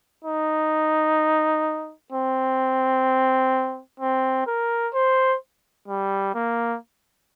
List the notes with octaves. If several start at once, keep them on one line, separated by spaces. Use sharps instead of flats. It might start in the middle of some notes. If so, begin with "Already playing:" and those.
D#4
C4
C4
A#4
C5
G3
A#3